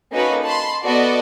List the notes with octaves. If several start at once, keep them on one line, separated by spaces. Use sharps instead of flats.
A#3 C#4 D#4 F#4 A4 B4
A5 B5 C6
B3 F#4 A4 D5 D#5